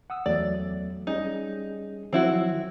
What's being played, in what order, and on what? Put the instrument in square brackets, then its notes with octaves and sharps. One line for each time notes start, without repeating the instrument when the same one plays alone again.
[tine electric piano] F#5 D#6 E6
[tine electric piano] E2 F#3 A3 [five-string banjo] D5
[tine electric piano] G3 C#4 G#4 [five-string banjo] D#4
[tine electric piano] D#3 F3 F#3 [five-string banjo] C4 E4 F#4